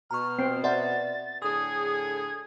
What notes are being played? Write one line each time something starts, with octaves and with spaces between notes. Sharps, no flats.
B2 A#5 C#6 F6
C4 G5 C7
C5 D5 E5 F#5 A6
A2 D3 G#4 D#6 G#6